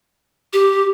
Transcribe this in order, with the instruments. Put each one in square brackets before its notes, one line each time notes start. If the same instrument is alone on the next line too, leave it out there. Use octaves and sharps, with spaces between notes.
[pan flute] G4